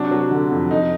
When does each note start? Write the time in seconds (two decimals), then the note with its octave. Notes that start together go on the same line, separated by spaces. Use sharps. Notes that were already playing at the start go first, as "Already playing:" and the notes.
Already playing: C3 F#3 D4
0.11 F#3
0.31 D3
0.51 F2
0.71 F2 D#4